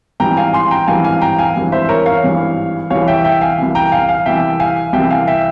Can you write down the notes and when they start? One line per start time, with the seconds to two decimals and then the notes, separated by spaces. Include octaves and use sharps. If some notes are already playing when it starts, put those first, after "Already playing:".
0.20 G#1 G2 E3 G5 A#5
0.37 F5 G#5
0.53 G#5 C6
0.71 G5 A#5
0.88 G#1 G2 E3 F5 G#5
1.04 F5 G#5
1.21 G5 A#5
1.38 F5 G#5
1.56 G#1 G2 E3
1.72 C5 E5
1.89 A#4 C#5
2.06 C#5 F5
2.23 G#1 G2 E3
2.90 C2 C3 E3 C#5 F5
3.08 E5 G5
3.24 E5 G5
3.41 F5 G#5
3.58 C2 C3 E3
3.75 G5 A#5
3.92 F5 G#5
4.09 F5 G#5
4.26 C2 C3 E3 E5 G5
4.60 F5 G#5
4.93 C2 C3 E3 E5 G5
5.10 F5 G#5
5.27 E5 G5